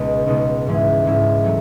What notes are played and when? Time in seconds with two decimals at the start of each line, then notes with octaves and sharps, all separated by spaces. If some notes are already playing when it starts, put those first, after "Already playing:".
Already playing: C#2 B2 G#3 B3 D#4
0.26 C#2 B2 G#3 B3 D#4
0.66 G#2 E3 G#3 C#4 E4
1.05 G#2 E3 G#3 C#4 E4
1.44 F#3 A3